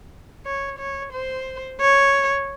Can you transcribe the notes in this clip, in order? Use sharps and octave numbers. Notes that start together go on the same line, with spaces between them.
C#5
C#5
C5
C#5